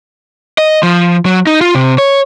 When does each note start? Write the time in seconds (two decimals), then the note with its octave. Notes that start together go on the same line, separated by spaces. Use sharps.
0.58 D#5
0.83 F3
1.25 F#3
1.47 D#4
1.61 F4
1.75 C3
1.98 C#5